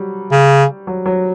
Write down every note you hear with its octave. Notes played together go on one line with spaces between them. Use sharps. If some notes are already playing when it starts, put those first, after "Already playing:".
Already playing: F#3 G3
C#3
F#3
F#3